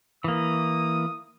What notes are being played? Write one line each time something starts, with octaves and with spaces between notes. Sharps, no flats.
E3 A#3 D#6